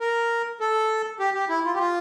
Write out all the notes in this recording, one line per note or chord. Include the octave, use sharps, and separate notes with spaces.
A#4
A4
G4
G4
E4
F4
G4
F4